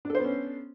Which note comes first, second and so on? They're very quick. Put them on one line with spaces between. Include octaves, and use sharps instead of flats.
D4 A4 C5 B3 C#4